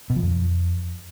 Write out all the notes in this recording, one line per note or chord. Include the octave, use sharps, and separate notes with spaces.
B2
F3
F2